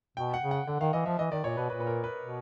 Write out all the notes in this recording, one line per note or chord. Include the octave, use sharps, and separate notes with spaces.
B2 G5
F#5
C#3
F#5
D3 F#5
D#3 F5
E3 D#5
F3 E5
E3 D#5
D#3 D5
A#2 C#5
B2 B4
A#2 B4
B4
A#4
B4
B2